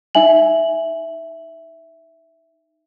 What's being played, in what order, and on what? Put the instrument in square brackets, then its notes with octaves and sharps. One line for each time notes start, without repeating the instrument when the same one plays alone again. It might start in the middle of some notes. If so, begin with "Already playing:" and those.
[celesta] D#4 E5 G#5 F#7